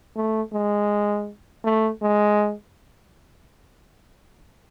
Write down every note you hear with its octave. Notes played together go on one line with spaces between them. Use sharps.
A3
G#3
A3
G#3